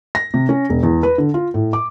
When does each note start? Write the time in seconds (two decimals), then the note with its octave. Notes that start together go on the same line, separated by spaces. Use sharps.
0.15 A#6
0.34 C3
0.49 C#4
0.69 E1
0.83 E2
1.03 B4
1.18 D3
1.34 F4
1.54 A2
1.73 D6